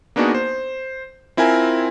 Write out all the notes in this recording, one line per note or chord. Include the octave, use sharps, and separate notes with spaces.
A#3 B3 D4 D#4 F#4 G#4
C5
C4 E4 F4 A#4 G#5